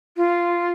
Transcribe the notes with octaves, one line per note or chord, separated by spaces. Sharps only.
F4